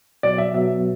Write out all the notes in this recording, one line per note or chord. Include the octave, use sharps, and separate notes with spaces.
B2 F#3 B3 D5
E5
B2 F#3 B3 E5